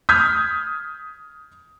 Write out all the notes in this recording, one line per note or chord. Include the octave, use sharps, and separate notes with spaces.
D#6 F6 G6 G#6 B6